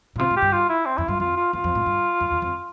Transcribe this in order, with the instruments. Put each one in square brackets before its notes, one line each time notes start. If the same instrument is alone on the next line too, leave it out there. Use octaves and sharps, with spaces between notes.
[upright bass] A#2
[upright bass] C3 [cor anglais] F4
[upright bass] A2
[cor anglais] G4
[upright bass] G2
[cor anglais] F4
E4
C4
[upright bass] F2 [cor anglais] E4
[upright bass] G2 [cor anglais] F4
[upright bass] F2 [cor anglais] F4
[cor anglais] F4
[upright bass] E2 [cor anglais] F4
[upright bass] F2
A2
G2
F2
E2
F2